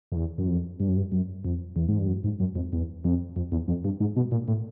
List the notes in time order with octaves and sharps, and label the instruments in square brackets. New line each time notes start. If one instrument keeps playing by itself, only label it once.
[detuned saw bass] F2
E2
F#2
F2
G2
F#2
G2
F#2
F2
E2
G#2
G2
F#2
G#2
F#2
F2
E2
F2
F2
E2
F2
G2
G#2
B2
A#2
A2